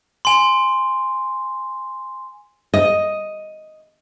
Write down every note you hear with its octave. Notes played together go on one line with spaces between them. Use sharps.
G#5 C6
D#5